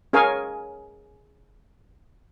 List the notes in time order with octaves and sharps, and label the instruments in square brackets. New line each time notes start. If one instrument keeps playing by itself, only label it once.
[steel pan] C#4 G#4 A#4 C#5 F5 G#5